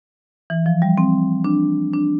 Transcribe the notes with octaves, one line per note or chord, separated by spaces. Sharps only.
E3
F3
G3
C4
D4
D4